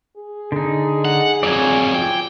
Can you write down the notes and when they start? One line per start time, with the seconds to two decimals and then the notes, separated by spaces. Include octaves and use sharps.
0.17 G#4
0.52 D3 D#4
1.05 F#5
1.43 F2 F#3 D5 G#5
1.94 F4 G5